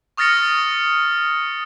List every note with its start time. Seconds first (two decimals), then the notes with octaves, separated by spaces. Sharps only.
0.17 C#6 D#6 F6 A6 A#6 C#7